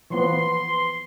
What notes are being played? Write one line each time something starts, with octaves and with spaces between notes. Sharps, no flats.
E3 F3 B3 C6